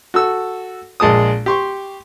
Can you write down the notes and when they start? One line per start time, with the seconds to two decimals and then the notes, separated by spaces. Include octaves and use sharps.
0.14 F#4 A4 E6
1.00 A#1 G#3 A5 D#6
1.46 G4 C6 C#6